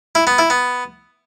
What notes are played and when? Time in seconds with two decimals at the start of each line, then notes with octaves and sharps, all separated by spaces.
0.15 E4
0.27 B3
0.39 E4
0.50 B3